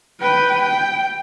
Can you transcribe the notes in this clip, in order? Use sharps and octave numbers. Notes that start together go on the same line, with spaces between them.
B4 G5
G5